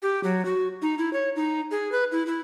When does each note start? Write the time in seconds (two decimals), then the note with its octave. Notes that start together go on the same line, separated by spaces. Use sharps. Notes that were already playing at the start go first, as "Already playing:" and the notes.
0.02 G4
0.24 F#3
0.45 F#4
0.82 D#4
0.98 E4
1.13 C#5
1.36 D#4
1.71 G#4
1.92 B4
2.12 E4
2.27 E4